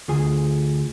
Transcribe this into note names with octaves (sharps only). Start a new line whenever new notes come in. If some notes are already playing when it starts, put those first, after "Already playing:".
D2 F4 G#4 G#5